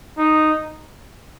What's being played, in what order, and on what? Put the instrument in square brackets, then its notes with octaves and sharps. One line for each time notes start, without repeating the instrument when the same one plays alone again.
[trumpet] D#4